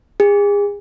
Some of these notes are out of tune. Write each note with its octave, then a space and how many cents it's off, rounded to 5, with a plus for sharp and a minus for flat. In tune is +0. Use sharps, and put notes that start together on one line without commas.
G#4 -35